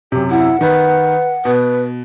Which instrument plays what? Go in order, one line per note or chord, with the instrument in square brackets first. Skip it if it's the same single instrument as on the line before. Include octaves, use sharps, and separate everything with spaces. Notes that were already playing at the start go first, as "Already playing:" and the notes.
[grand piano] F#2 C3 [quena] G4
[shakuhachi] E4 [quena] F#5
[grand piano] D#3 [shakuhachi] B4
[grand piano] B2 [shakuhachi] B4